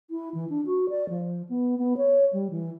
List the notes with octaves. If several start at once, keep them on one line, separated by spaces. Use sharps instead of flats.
E4
E3
D4
F#4
D5
F3
B3
B3
C#5
G3
E3